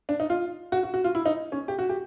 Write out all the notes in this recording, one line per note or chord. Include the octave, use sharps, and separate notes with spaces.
D4
D#4
F4
F#4
F#4
F#4
F4
E4
D#4
C#4
G4
F#4
G4